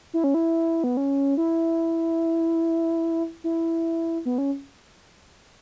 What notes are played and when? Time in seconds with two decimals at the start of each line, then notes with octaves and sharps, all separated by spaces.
0.14 E4
0.24 C#4
0.34 E4
0.84 B3
0.97 C#4
1.37 E4
3.44 E4
4.25 B3
4.38 C#4